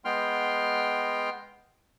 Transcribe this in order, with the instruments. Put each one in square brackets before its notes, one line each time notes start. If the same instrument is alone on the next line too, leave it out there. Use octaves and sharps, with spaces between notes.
[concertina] G#3 B3 G5 C6 F6